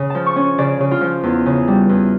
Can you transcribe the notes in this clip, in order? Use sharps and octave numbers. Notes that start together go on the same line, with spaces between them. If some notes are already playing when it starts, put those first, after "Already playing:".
Already playing: C#3
F3 A5
C#6
C#4
C#3 D5
C#3
F4
F3
E2
C#3
G3
E2